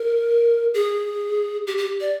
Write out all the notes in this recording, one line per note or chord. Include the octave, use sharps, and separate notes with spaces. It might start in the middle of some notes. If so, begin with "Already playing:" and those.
Already playing: A#4
G#4
G4
G4
D5